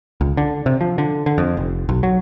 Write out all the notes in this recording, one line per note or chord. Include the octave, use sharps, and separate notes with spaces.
C#2
D3
C3
F3
D3
D3
F2
F1
B1
F#3